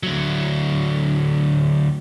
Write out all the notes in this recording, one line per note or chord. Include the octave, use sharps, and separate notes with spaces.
D2 F#3